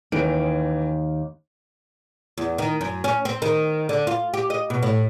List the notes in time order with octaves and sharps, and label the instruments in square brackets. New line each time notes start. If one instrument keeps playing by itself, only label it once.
[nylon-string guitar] D#2 [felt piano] E3 C#4 D7
[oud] E2
D#3
F#2
C#4
C4
D#3
D3
F4
G4
D#5
B2
A2